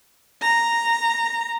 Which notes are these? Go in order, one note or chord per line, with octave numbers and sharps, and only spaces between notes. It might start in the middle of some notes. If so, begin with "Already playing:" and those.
A#5